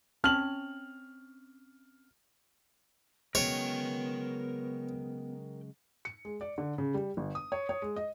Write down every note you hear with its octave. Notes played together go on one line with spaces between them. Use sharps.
C4 C#4 A5 F6 F#7
C#3 F#3 G#3 B3 A#4 C#5 G5
C#7
G#3
D5
D3
C#3
G3
G1
D#6
C#5
C#5
G#3
D#5